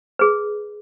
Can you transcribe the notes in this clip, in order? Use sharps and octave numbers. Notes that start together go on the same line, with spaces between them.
G#4 B4